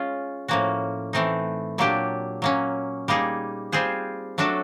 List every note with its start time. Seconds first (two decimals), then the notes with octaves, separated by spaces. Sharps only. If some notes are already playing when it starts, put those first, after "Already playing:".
Already playing: G#3 C#4 F4
0.48 A2 F3 A#3 C#4 F#4
1.13 E3 A3 C4 D#4
1.78 A#2 F#3 A#3 D4 G4
2.42 F#3 A#3 C#4
3.08 G3 A#3 D#4 G#4
3.72 G3 C4 F4 G#4 C5
4.38 F#3 A3 D4 F#4 A4